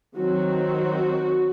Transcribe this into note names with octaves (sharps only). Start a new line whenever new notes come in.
D#3 F#3 C4 F#4